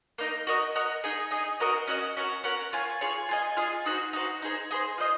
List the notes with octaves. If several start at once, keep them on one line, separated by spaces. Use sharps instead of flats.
A#3 D#4 A#4
F#4 A#4 D#5
F#4 A#4 D#5
D#4 G#4 D#5
D#4 G#4 D#5
C#4 F#4 A#4 D#5
C#4 F#4 A#4 D#5
C#4 F#4 A#4
C#4 F#4 A#4
F4 G#4 C#5
F4 G#4 C#5
F4 G#4 D#5
F4 G#4 D#5
D#4 F#4 C5
D#4 F#4 C5
D#4 G#4 C5
D#4 G#4 C5
F4 C5 D#5